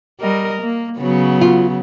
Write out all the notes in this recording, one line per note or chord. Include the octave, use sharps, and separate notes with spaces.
G3 A#4 D#5
A#3
C#3 F#3 B3
F4